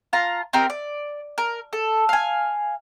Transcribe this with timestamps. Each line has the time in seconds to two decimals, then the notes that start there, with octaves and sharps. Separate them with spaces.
0.13 F4 F5 A5 A#5
0.53 C4 D#4 G4 A#4
0.70 D5
1.38 A#4
1.73 A4
2.09 F5 G#5